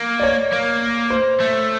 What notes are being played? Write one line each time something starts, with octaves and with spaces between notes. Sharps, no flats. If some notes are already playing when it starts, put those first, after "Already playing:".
Already playing: A#3
D5
C#5
A#3
C5
A3